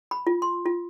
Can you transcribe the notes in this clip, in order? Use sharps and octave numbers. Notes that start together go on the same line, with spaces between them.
B5
F4
C6
F4